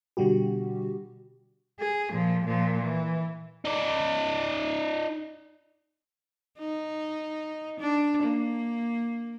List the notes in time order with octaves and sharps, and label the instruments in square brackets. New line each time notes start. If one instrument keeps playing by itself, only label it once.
[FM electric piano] B2 D3 G3 F#4 G4
[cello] G#4
A#2 F3
A#2 F3
E3
[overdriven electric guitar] D#4 D5
[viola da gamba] D#4
D4
A#3